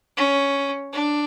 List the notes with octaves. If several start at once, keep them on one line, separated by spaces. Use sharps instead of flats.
C#4
D4